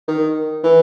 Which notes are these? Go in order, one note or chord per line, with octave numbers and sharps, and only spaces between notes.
D#3
E3